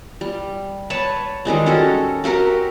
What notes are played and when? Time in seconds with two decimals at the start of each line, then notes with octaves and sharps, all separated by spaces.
0.21 G3
0.90 B4 C#5 A5
1.45 D#3 G3 G#3 C4
1.66 C#4 F#4 A4
2.24 C4 F#4 G4 A#4